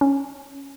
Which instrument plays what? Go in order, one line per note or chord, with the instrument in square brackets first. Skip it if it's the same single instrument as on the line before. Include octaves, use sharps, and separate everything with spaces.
[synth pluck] C#4